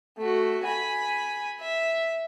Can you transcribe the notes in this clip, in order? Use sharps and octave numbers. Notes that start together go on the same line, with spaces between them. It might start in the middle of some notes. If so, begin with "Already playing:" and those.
A3 F#4
G#5 B5
E5